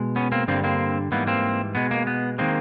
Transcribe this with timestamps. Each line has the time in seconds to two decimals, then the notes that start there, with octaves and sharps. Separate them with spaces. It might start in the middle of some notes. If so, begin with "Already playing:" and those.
Already playing: B2 G#3
0.16 B3 C#4
0.32 A#3 C4
0.48 G2 D3 G3 A#3 C4
0.64 A#3 C4
1.11 G#2 E3 G3 A#3 B3
1.27 A#3 C4
1.75 B2 G#3 B3
1.91 A#3
2.07 B3
2.38 D#3 G#3 A#3 C4